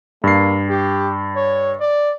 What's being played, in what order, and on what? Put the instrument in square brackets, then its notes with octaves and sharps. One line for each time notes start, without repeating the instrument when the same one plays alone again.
[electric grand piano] G2 C7 [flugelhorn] A#3
[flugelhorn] G4
C#5
D5